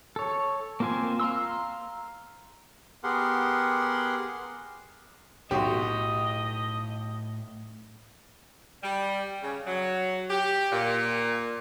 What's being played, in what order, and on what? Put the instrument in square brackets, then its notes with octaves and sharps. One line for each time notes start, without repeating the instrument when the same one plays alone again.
[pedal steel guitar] A4 C#5
A#3 C4 F4 C5 G#5
F5 A#5 C6 E6
[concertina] B3 G4 G#4 A#4 F#5 C6
[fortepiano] B1 F#4 C6 [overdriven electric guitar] A2 [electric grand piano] G4 [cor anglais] D#5
[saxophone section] G3
C#3
F#3
G4
A#2